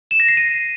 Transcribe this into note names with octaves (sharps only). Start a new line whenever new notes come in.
E7
A#6
C7
D#7